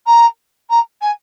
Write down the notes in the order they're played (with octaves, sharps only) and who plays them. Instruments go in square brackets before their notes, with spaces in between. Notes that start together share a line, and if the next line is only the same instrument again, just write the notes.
[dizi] A#5
A#5
G#5